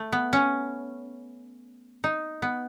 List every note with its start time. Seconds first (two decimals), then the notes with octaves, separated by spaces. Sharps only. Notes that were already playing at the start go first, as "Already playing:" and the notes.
Already playing: A3
0.12 B3
0.33 C#4
2.04 D#4
2.42 B3